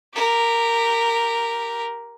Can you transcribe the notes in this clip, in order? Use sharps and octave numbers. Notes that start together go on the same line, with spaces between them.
G4 A#4